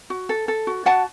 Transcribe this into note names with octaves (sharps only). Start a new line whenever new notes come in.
F#4
A4
A4
F#4
F#4 F#5 A5